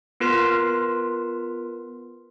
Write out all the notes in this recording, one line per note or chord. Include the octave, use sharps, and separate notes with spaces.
B3 F4 A#4 B4 C6 B6